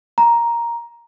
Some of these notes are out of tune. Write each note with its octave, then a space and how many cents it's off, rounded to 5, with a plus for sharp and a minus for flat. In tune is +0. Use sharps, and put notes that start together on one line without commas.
A#5 +5